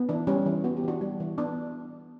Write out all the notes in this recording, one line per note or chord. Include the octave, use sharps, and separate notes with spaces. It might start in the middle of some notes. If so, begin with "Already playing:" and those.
Already playing: B3
E3 D4
G3 C#4
E3
B3 F#4
G4
E3 D4 F#4
G3 D4
E3
B3 D4